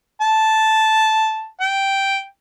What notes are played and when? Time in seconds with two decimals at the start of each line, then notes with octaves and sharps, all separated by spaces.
0.22 A5
1.60 G5